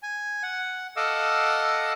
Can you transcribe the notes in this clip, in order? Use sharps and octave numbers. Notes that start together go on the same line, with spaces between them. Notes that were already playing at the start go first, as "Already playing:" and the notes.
G#5
F#5
A4 D#5 F5 F#5 D6 E6